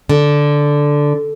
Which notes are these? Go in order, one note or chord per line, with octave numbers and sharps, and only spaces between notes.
D3